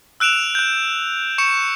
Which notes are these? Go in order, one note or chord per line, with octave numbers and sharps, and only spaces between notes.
E6 F#6 D7 E7 F7
F#6 G6
C#6 C#7 E7